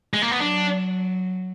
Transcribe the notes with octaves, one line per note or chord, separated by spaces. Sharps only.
G#3
A#3
B3
F#3 D4